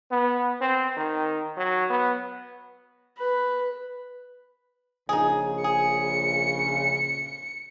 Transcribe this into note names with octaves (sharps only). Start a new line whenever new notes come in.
B3
C4
D#3
F#3
B3
B4
A#1 C#3 D#4 G#4
G#4 C#7